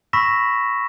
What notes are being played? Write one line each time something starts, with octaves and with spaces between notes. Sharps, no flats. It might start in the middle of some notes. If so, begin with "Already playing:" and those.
B5 C#6 E6 A#6 B6 E7